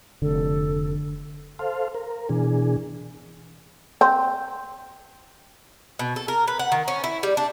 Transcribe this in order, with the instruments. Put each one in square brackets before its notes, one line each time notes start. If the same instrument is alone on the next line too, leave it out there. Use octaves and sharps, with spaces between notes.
[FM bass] F1 [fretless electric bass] D3 [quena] A4
[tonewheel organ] A4 C5 F5
A#4
B2 E3 D4 G#4
[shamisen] C4
[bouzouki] B2
A4
A#4
B4
F#5
D#3
C#4
E4
G3
D4